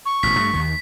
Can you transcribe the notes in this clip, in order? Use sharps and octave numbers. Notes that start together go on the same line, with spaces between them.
C#6
A1 B2 B6
G2 A3
D#2 D#3